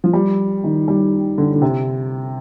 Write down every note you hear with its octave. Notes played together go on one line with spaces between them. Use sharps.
F3
G3
D#3
G3
D3
D3
C3